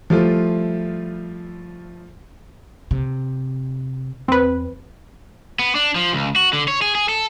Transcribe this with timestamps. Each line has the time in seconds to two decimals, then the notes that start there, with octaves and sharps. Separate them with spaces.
0.10 F3 G3 A3 E4 F4
2.91 C3
4.28 E2 C4 B4
5.59 B3
5.75 D4
5.95 F3
6.13 C#2
6.36 F#4
6.53 D3
6.68 C#5
6.82 G#4
6.95 G#4
7.09 A4